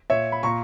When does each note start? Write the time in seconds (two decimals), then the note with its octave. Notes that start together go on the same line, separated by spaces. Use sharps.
0.10 A#2 C#5 E5
0.32 B5
0.43 A#2 A#5 C#6